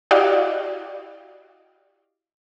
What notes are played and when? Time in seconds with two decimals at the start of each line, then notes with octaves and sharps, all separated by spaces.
0.11 E4 F#4 G4 D5 D#5 F5